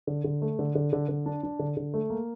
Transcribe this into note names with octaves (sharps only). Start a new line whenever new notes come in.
D3
D3
A3
D3
D3
D3
D3
D4
D4
D3
D3
A3
A#3